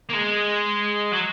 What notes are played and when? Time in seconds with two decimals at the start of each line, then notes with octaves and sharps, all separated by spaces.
0.09 A#3
0.13 G#3
1.12 F#3